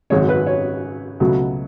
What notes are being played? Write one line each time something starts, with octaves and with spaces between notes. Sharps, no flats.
G#1 F#2 C#3 G#3 C#5
B4
C#5
C#2 B2 F#3 A3